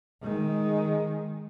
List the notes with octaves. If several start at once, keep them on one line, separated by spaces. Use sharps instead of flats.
D#3 G#3